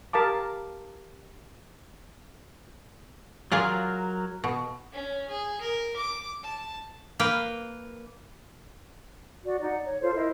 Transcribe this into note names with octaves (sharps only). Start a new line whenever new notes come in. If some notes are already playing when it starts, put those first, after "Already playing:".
G4 A#4 F5 A5 D6
F#3 F4 G#4 A#4 D5
B2
C#4
G#4
A#4
D6
A5
A#3 B4 G5
F#4 D5
D#4 D5 F#5
C#5
F4 A4 C5
E4 A#4 C5 D#5